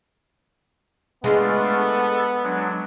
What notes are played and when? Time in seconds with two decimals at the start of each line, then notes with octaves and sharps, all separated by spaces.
1.24 G#3 A3 B3 D4 F4
1.78 A4
2.43 F#3 G#3 D4